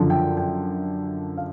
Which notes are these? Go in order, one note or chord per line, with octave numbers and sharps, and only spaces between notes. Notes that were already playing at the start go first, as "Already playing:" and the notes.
Already playing: F#2 D3 F3
G5
G5
F5